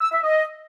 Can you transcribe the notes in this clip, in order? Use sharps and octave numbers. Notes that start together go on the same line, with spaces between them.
E6
E5
D#5